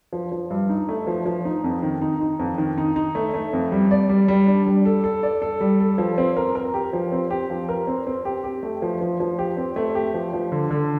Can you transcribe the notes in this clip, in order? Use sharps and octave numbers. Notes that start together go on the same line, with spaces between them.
F3
F3
G2
D#4
A3
F3
F3
D#4
F2
D#3
D#4
D#4
F2
D#3
D#4
D#4
A3
A3
F2
G3
D5
G3
G3
D4
G3
A4
A4
D5
A4
G3
A4
F3
C4
A#4
A#4
G4
F3
C4
G4
F3
A#4
C4
C4
G4
G4
A3
F3
F3
F3
G4
C4
A3
G4
F3
F3
D3
D3